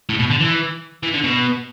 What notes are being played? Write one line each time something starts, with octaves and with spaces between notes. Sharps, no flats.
A2
B2
D3
E3
E3
D3
B2